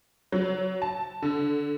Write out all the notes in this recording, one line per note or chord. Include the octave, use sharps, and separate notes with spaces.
F#3
A5
D3